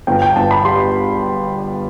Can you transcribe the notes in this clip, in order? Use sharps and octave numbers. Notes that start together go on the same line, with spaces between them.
G1 G5
G5
G1 A5
B5
G3 C6